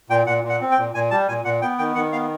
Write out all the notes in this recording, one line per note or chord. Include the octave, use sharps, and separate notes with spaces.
A#2 G5
A#2 F#5
A#2
F#5
C4
G5
A#2
A#2 G#5
G3 A5
A#2 G#5
A#2 F#5
B3 G5
D#3 G5
D#3 F#5
B3 F5